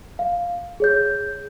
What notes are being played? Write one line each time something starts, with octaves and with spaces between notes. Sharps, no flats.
F5
G#4 C#5 G6